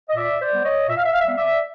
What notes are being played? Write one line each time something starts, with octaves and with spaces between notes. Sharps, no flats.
D#5
A#2 D5 E5
C5 D5
G3 B3
C#5 D#5
A#2 E5
F5
E5
F5
E5
G3 B3 F5
D5 E5